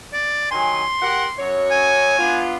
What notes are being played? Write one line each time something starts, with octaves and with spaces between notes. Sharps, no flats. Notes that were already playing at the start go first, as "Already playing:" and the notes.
D5
D#3 F#3 G#5 C6
G4 A#4 F#5
F#2 F#3 C#5
G#5
B3 D4 F4